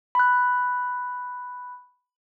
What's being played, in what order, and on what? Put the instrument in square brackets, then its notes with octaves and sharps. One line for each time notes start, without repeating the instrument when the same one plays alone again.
[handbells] B5 F#6